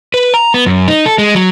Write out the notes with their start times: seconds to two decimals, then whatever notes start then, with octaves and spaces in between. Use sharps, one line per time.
0.14 B4
0.34 A#5
0.54 B3
0.66 F#2
0.88 D#4
1.06 A4
1.18 G#3
1.35 F#3